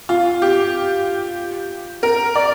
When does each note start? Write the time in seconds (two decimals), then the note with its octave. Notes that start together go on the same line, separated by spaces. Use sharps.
0.09 F4
0.42 G4
2.03 A#4
2.36 D5